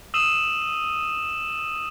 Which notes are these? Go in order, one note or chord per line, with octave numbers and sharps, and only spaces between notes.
D#6 E6 D#7 E7 F#7